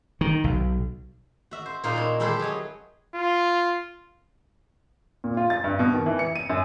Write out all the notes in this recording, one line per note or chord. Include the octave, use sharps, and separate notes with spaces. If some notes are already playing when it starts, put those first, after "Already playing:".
D#3
B1
F#4 E5
C5
A#2 A#3 D#4 F4 C5
E4 C#5
G#3 E4 G4 A4 B4 C5
F#3 G#4 C#5 D#5
F4
A#2
F4
A6
G2
B2
D#3
E3
C#7
D#7
F#2